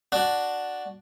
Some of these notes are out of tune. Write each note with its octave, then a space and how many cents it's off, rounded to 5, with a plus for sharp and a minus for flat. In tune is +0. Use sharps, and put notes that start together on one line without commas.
D4 +0 F#4 +0